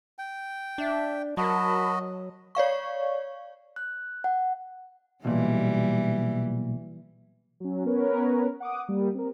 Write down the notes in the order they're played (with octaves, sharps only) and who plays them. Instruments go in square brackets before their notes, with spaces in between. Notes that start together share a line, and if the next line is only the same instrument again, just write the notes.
[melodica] G5
[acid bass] D4 [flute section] E5
[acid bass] F#3 [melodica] F#4 D#5 [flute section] A#4 A5 B5
[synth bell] C#5 D5 F5 C#6
[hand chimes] F#6
F#5
[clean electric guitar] B1 A#2 [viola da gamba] E3 G3
[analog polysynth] F#3 C#4
B3 C#4 A#4 B4 C#5
F#5 D6 D#6
G3 A#3
C4 A#4